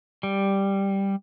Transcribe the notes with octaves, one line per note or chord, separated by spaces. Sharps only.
G3